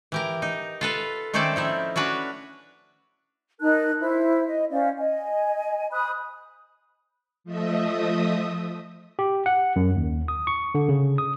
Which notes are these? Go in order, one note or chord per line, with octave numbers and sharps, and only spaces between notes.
E3 G4 A#4
D#4
F4 A4 B4
D#3 A3 C4 C#4 A4 D5
F3 D#4 E4
C#4 D4 F#4 B4 C#5
D#4 A#4 A5 F#6
E4 C5
D#5
C#4 C5 D5 F5
D#5 G#5
C5 B5 D#6 F#6
F3 A3 D#5 E5 D#6
G4
F#5
F#2
D#2
D#6
C#6
D3
C#3
D#6